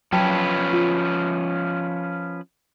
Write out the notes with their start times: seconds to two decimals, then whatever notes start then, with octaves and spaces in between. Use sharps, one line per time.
0.12 F3 F#3 C#4 B4 G5 A5
0.73 F4